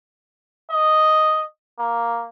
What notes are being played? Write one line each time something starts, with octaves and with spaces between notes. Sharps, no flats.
D#5
A#3